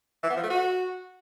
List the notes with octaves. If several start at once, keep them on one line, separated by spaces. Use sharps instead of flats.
E3
B3
F3
A3
F#4